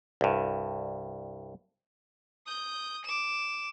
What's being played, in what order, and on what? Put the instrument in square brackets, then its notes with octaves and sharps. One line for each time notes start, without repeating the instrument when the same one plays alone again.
[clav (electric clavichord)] C2 G2
[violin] D#6 G6
D6 E7